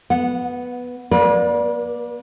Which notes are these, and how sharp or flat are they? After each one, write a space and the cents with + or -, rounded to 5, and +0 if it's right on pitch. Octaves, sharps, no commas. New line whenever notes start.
B3 +0 F#5 -15
A#3 +30 B4 -40 D5 +0